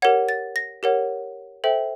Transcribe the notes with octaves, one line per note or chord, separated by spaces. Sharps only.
G4 A#4 C#5 F#5 G#6
A6
A#6
G4 A#4 C#5 F#5
A4 C5 E5 G5